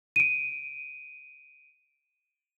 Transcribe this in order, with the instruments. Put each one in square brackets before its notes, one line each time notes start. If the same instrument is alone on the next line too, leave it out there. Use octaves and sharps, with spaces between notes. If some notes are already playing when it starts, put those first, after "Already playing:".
[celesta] D7 D#7